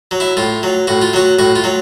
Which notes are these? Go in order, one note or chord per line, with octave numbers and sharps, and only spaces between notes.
F#3
E4
A2 F4
F#3
A2 F#4
F4
F#3 F#4
A2 F#4
F4
F#3